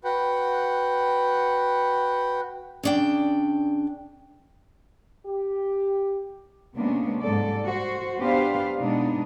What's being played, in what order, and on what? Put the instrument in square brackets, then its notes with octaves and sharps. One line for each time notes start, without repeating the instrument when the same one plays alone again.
[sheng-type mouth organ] F#4 B4 F#5 G5
[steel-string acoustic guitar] C#3 D4 G5
[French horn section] G4
[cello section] C3 G#3 A#3 B3 C#4 D4
G#2 G3 A4 D5
F#4 C5
B3 D4 G4 B4 C5 F5
B2 G#3 B3 D4 D#4